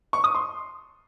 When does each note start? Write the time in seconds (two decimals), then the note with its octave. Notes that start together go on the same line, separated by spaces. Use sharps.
0.13 C#6
0.24 D#6
0.35 C6